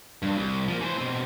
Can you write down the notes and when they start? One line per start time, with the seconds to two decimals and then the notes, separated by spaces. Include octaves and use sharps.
0.22 G2
0.38 C2
0.68 F3 A#3
0.81 E3 C5
0.98 B2 C4